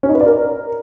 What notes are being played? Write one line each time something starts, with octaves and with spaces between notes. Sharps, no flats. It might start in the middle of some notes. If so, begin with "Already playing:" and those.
C#4
D#4
B4
D5
A#4